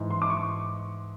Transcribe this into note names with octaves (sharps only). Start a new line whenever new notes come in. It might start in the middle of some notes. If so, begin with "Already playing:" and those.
Already playing: G#2 E3
C6
D6
C#6